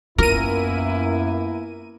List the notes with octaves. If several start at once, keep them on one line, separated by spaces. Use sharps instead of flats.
F#2 A#3 B3 E4 F4 A#4 D#7